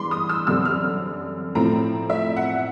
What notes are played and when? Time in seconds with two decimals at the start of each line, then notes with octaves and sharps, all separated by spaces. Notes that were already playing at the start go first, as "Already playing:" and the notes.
Already playing: G2 E3 G#3 B3 B5 C6 D6
0.11 D#6
0.29 E6
0.47 F#2 D3 G3 C4 E6
0.65 F6
1.55 A2 F3 A3 C4 A#5
2.10 E5
2.36 F#5